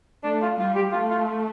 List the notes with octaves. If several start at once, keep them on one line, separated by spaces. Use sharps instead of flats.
A3 D4
F4
G3 F4
G4
A3 F4
F4